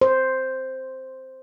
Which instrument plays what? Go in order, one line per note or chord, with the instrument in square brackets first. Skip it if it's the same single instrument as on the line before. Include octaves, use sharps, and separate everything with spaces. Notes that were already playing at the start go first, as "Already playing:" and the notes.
[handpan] C5